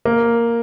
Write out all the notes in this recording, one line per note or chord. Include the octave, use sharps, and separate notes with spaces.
A#3